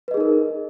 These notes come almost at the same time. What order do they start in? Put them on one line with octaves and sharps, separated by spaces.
B4 D#5 G#4 D#4 A#4